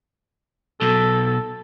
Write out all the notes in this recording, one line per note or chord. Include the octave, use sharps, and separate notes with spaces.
B1 B2 A4